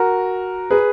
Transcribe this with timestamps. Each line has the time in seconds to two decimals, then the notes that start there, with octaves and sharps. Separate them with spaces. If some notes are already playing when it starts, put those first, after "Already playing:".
Already playing: F#4 A#4
0.70 G#4 B4